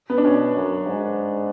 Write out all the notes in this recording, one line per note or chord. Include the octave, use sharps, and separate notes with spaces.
B3
D4
B2 C#4
F#2
G#2